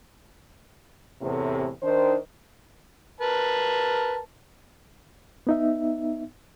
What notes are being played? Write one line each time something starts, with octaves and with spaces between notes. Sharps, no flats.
E2 A2 C3
D#3 D4 C5
A#4 B4 A5
B3 D#4 E5